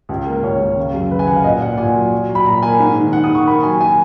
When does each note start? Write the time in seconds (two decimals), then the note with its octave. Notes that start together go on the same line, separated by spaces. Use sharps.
0.09 C#2
0.26 A#3
0.43 C#2 C#5
0.60 C#2
0.76 C#3
0.93 F#2
1.11 C#3 B4
1.19 G#5
1.27 C#3 F#5
1.36 F5
1.44 A#2 D#5
1.61 A#2 F#5
1.78 A#2 G#5
1.94 F#3
2.12 F#3
2.29 F#3
2.35 B5
2.46 A#2 A#5
2.62 A#3 G#5
2.79 G#2
2.97 D#3
3.13 G#2 F#5
3.24 D#6
3.30 D#3
3.35 C#6
3.47 A#3 B5
3.63 F#3 G#5
3.80 F#3 G#5